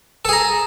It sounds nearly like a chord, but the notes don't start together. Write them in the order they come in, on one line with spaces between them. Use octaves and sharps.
A4 G#4 A#5